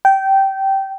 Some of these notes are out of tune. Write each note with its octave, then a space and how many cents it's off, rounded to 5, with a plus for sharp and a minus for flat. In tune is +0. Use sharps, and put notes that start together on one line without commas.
G5 -15